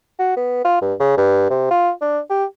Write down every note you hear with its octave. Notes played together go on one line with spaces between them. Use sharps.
F#4
B3
F4
G2
C#3
G2
C3
F4
D4
G4